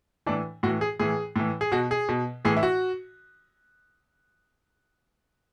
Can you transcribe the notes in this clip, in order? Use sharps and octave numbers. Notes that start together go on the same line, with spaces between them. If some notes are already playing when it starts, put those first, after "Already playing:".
A2 E3 D4
A2 E3 F#4
G#4
A2 E3 G#4
A2 E3
G#4
B2 F#4
G#4
B2
A2 E3 G#4
E4
F#4